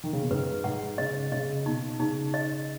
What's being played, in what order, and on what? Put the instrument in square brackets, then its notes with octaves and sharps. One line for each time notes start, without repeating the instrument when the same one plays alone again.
[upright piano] D#3
C#3
B2
[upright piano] G#2 [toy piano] B4
[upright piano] G#2 [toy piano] F#5
[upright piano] C#3 [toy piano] D#5
[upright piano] C#3 [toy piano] D#5
[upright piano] B2 [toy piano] D#4
[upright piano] C#3 [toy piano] D#4
[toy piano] D#5